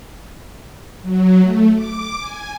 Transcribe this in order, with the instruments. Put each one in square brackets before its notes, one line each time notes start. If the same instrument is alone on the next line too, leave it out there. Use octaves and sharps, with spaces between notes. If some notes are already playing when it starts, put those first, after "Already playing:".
[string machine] F#3
A3
D6
G#5